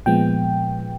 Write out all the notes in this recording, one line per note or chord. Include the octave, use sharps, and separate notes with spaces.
A#2 F3 G#3 B3 G5